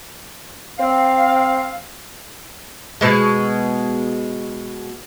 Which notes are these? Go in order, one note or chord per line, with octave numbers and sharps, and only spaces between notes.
C4 F5
B2 G#3